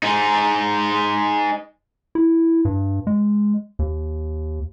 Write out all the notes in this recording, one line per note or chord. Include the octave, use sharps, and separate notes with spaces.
G#3 D#4
E4
G2
G#3
D#2